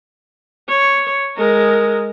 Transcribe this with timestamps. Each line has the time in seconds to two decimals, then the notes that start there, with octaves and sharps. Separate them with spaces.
0.69 C#5
1.37 G#3 A#4